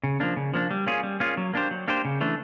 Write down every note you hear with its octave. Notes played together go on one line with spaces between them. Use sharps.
C#3
F3 A#3 D4
C#3
F3 A#3 D4
G3
A#3 C#4 F4 G#4
G3
A#3 C#4 F4 G#4
F#3
A#3 D4 G4 C5
F#3
A#3 D4 G4 C5
C#3
E3 A3 D4